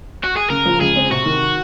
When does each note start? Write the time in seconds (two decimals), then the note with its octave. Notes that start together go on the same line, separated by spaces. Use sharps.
0.24 F#4
0.37 G#4
0.50 C#3 A#4
0.65 F3
0.81 C#2 G#4
0.96 C4
1.11 C3 F#4
1.26 D#3